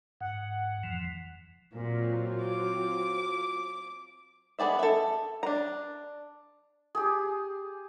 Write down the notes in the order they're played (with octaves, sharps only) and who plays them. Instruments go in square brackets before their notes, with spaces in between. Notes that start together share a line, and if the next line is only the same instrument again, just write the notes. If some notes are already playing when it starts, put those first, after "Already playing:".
[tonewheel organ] G#2 [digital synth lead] F#5
[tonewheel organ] F2 E3 F3
[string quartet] A#2 [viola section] F#3 C4 F4
[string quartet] D6
[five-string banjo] B3 G#4 D5 E5
A4 E5
D4 A#5
[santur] G4 G#4